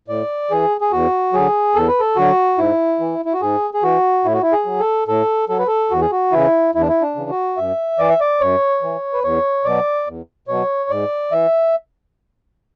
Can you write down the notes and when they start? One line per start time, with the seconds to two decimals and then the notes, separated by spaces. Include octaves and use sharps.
0.08 A2 D5
0.51 E3 G#4
0.81 G#4
0.92 E2 F#4
1.33 D3 F#3 G#4
1.75 E2 A4
1.88 B4
2.00 A4
2.16 D3 F#3 F#4
2.58 G#2 E4
3.00 E3
3.25 E4
3.33 F#4
3.42 G#2 G#4
3.74 G#4
3.83 E3 F#4
4.25 A2 E4
4.34 F#4
4.42 E4
4.52 G#4
4.66 F#3
4.80 A4
5.08 A2 A4
5.49 F#3 A4
5.59 B4
5.67 A4
5.91 E2 F#4
6.01 G#4
6.12 F#4
6.32 C#3 E3 E4
6.75 E2 E4
6.81 D4
6.88 E4
7.02 D4
7.16 C#3 E3
7.30 F#4
7.57 F#2 E5
7.99 E3 D5
8.09 E5
8.21 D5
8.40 F#2 C#5
8.82 E3
9.13 B4
9.24 E2 C#5
9.65 B2 F#3 D5
10.07 E2
10.48 B2 F#3 C#5
10.90 G#2 D5
11.32 E3 E5